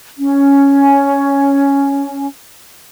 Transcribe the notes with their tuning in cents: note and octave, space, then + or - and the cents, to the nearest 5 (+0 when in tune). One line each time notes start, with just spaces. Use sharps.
C#4 +5